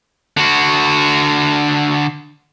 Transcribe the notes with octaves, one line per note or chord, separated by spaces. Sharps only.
D3 F#4